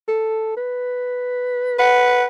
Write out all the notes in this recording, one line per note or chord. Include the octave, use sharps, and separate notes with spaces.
A4
B4
B4 F#5